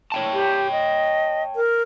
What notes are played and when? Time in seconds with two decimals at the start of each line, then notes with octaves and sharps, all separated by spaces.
0.12 C#5 G5 A5
0.34 G4
0.72 D#5
1.56 A#4